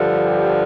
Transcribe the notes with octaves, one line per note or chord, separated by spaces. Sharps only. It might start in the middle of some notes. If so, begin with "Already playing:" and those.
Already playing: G2 D3 F3
G4